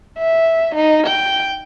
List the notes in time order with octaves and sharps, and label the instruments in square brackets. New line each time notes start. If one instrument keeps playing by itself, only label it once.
[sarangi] E5
D#4
G5